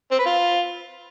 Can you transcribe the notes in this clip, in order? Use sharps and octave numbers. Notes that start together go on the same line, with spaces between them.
C4
B4
F4